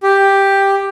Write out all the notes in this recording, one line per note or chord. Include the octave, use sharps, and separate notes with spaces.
G4